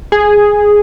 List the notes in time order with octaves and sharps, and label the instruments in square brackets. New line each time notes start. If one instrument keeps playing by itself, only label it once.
[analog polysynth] G#4